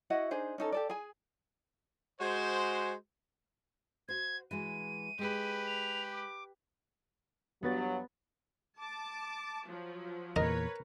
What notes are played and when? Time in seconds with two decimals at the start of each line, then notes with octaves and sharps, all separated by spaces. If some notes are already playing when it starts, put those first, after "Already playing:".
0.10 E4 F#4 D#5 F#5
0.31 D4 D#4 G#4 C5
0.58 C#4 D#4 A4
0.72 G4 A4 D5
0.90 G#4 G#5
2.21 G#3 F#4 C5
4.08 F#4 C5 G#6
4.51 E3 G#3 F#4 D#7
5.19 G#3 G4 G#4 B4
5.66 F7
6.13 D6
7.63 G2 F#3 B3 B4 A6
8.77 A5 D6
9.66 F3 F#3
10.36 E2 A#2 A#4 B4 C#5 D#5